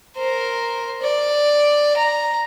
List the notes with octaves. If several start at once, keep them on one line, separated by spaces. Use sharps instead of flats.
A#4 C5
D5
A#5